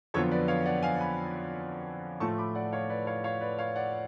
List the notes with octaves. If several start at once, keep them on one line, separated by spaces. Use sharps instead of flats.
F2 D3 F#3 B3 F4 A4 C#5
B4 D5
C#5 F5
D5 F#5
F5 G#5
G#5 B5
A2 F3 A3 F4 A5 C#6
B5 D6
D5 F#5
C#5 F5
B4 D5
C#5 F5
C#5 F5
B4 D5
C#5 F5
D5 F#5